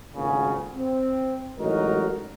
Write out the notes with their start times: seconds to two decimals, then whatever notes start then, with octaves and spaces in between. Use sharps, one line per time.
0.16 G#1 D2 A#2 C#3
0.75 C4
1.59 A1 F#3 G#3 D#4 F#4 A#4